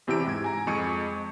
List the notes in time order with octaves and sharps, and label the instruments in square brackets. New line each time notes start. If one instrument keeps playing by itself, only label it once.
[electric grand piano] E2 C3 E4 G4 E6 D7
G#2 G#6
G#5 A#5
F2 G#3 C#6 C#7 D#7